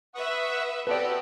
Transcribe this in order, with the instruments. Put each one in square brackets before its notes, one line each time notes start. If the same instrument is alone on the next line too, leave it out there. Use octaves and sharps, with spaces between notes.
[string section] B4 E5 [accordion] F#5 C#6 D#6
[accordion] B3 C4 A4 [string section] F#4 G4 [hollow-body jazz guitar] B4 D5